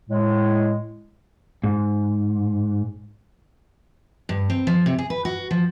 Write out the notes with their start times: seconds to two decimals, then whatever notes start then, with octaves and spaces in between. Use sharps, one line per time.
0.09 A2 G#3
1.64 G#2
4.29 G2
4.50 C4
4.67 F3
4.86 C3
4.98 G#4
5.10 B4
5.25 F#4
5.51 F3